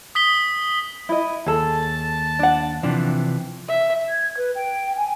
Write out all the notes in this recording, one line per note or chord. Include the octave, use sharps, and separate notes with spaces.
D#6 B6 G7
E4 D#5
D#2 G#4 A4 A5
D4 F#5
C3 E3 F3 D4
E5
G#6
B4
G5
G#5